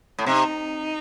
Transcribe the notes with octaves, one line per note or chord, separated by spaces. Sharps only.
A2
C3 D#4